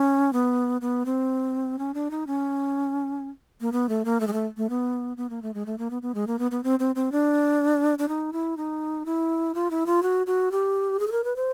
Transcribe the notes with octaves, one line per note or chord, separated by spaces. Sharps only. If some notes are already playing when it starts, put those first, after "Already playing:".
Already playing: C#4
B3
B3
C4
C#4
D4
D#4
C#4
A#3
B3
A3
A#3
A3
G#3
A3
A3
B3
B3
A#3
A3
G#3
A3
A#3
B3
B3
G#3
A#3
B3
B3
C4
C4
C4
D4
D4
D#4
E4
D#4
E4
F4
E4
F4
F#4
F#4
G4
G#4
A4
A#4
B4
C5